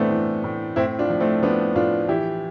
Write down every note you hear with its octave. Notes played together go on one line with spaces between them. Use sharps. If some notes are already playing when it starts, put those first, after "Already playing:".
Already playing: A2 E3 A3 B3 C4 D4
E3
A2
A2 C4 E4
D4 F4
F3
A3 C4
F3 B3 D4
A2 D4 F4
E3 E4 G4